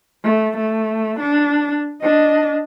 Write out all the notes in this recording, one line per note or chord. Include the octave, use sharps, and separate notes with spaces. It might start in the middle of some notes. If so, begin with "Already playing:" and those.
A3
A3
D4
D4 D#5